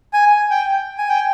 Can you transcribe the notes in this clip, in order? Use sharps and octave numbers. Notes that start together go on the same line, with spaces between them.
G#5
G5
G#5
G5